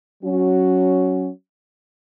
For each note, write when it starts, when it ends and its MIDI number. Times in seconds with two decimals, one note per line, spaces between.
0.24 1.30 54
0.24 1.30 61
0.24 1.30 66